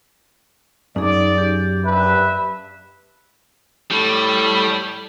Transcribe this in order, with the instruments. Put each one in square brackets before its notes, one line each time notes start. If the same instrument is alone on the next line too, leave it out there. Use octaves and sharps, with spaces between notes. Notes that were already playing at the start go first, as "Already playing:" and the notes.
[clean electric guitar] F#2 [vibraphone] D#4 G#4 [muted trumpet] D5
[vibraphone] G4
[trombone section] A#1 D4 B4 [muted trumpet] E5
[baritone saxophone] A2 [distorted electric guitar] G3